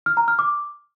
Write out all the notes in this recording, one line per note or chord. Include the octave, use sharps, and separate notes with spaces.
F6
A#5
F6
D6